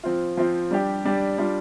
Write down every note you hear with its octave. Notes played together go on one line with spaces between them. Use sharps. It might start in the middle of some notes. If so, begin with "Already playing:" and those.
F3 C4 F4
F3 C4 F4
G3 D4 G4
G3 D4 G4
G3 D4 F4